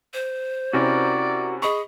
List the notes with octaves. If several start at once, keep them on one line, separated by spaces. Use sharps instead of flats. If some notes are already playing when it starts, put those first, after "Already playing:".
C5
C3 C#4 E4 F#4 A#4 D5
G#4 D#5 B5 C#6